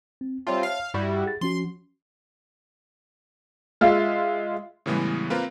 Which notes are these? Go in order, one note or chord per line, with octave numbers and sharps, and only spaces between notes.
C4
G3 C4 F4 C#5 E5 A5
F5
G2 G3 E4 F#4
G#4 A6
F3 C#4 F#4 C6
G#3 F4 E5 F5
A2 C#3 E3 G3 G#3 B3
A#3 C4 F4 A#4 B4